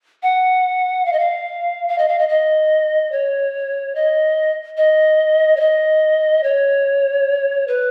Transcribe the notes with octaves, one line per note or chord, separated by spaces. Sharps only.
F#5
F5
D#5
F5
F5
D#5
F5
D#5
D#5
C#5
D#5
D#5
C#5
D#5
C#5
B4